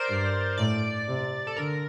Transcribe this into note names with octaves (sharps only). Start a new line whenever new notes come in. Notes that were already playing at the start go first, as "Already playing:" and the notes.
Already playing: A#4 C5 D5
G2
A2 D5
C3
A4
D3 A#4